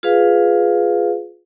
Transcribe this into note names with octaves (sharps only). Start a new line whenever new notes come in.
F4 G#4 B4 F5